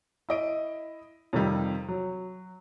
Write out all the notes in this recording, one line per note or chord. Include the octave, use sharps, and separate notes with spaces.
E4 D#5 D7
F2 C3 D#3 G3
F#3